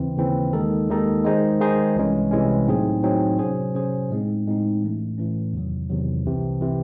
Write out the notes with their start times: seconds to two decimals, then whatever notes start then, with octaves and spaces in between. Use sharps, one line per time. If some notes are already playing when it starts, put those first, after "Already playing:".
Already playing: D#2 C#3 E3 C4
0.17 D#2 C#3 E3 C4
0.53 D#2 D#3 G#3 D#4 A4
0.89 D#2 D#3 G#3 D#4 A4
1.24 D#3 G#3 D#4 G#4 C5
1.60 D#3 G#3 D#4 G#4 C5
1.96 C2 C3 E3 G#3 C#4
2.31 C2 C3 E3 G#3 C#4
2.67 A2 F#3 C4 D#4 G#4
3.03 A2 F#3 C4 D#4 G#4
3.39 C3 F#3 C#4 G#4 C5
3.75 C3 F#3 C#4 G#4 C5
4.10 A2 G#3 C4 D#4
4.46 A2 G#3 C4 D#4
4.83 A2 E3 A3 C#4
5.18 A2 E3 A3 C#4
5.53 E2 C3 D#3 F#3
5.89 E2 C3 D#3 F#3
6.25 C2 C3 E3
6.61 C3 E3